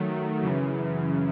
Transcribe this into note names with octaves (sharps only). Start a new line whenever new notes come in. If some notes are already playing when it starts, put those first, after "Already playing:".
Already playing: D#3 F#3 A3
F#2 C#3 E3